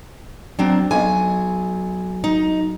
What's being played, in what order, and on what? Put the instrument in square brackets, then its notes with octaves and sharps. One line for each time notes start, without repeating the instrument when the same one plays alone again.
[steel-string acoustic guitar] F#3 C4 D4
[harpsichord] B1 [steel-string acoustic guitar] G#5
[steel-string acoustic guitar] D#4